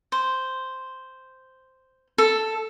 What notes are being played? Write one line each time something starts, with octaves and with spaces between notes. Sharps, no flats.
C5
A4